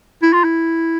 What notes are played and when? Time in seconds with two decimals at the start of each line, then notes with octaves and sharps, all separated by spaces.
0.23 E4
0.33 F4
0.44 E4